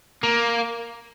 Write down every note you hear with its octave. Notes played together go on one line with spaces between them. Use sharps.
A#3